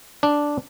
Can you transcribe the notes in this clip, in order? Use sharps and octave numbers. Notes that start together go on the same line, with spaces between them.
D4